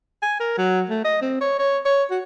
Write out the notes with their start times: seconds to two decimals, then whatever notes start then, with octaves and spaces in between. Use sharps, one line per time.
0.22 G#5
0.40 A#4
0.58 F#3
0.90 A3
1.04 D#5
1.22 C4
1.41 C#5
1.59 C#5
1.85 C#5
2.11 F#4